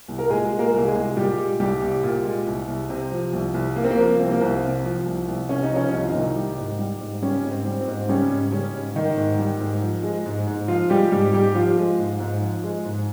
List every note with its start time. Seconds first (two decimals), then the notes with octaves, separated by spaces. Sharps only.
0.08 C2
0.19 A#4
0.30 A#2 G#3 G#4
0.52 G#3
0.59 A#3 A#4
0.74 C2
0.87 G#3 G#4
0.95 C2
1.17 A#2 G3 G4
1.38 G#3
1.60 C2 G3 G4
1.82 C2
2.03 A#2
2.25 G#3
2.47 C2
2.68 C2
2.89 C3 C4
3.12 F3
3.33 C2
3.54 C2
3.76 C3 A#3
3.84 C4
3.91 A#3
3.98 F3
4.19 C2 C4
4.31 A#3
4.41 C2 C4
4.63 C3
4.84 F3
5.06 C2
5.28 C2
5.49 C3 C#4
5.63 D#4
5.71 C#3 F3 C#4
5.93 C2 D#4
6.02 F4
6.10 C2 D#3 D#4
6.36 G3
6.58 G#2
6.79 G3
7.01 G#2
7.22 C#3 G3 C#4
7.45 G#2
7.51 C4
7.66 G3
7.81 C4
7.88 G#2
8.09 C#3 G3 C#4
8.31 G#2
8.52 C#3 G3 C#4
8.74 G#2
8.96 D#3 G3 D#4
9.17 G#2
9.39 G3
9.60 G#2
9.83 F3
10.03 G#3
10.26 G#2
10.47 G#2
10.68 F3 F4
10.90 G3 G#3 G4
11.12 G#2 G3 G4
11.33 G#2 G3 G4
11.55 F3 F4
11.77 G#3
11.99 G#2
12.20 G#2
12.42 F3
12.64 G#3
12.85 G#2